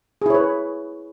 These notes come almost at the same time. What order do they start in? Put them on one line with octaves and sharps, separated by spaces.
G#4 E4 C#5 B4